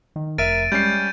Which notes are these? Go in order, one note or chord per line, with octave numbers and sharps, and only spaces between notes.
D#3
F1 A#4 E5 A6 D7 D#7
G3 G#3 C#4 G6 C7